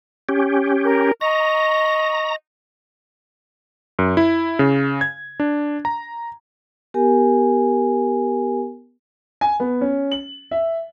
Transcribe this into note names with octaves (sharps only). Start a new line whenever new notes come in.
C#4 G4
A#4
D#5 A#5 C#6
F#2
E4
C#3
G#6
D4
A#5
B3 G4 A#4 G#5
G#5
B3
C#4
F#7
E5